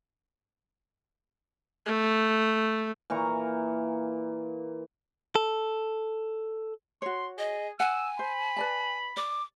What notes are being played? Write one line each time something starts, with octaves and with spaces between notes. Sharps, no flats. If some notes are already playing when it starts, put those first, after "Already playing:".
A3
A#2 E3 A#5 C#6
A4
F#4 C#5 C6
G#4 D#5
F#5 G#5 E6
C5 B5
B4 D5 A5
D5 D6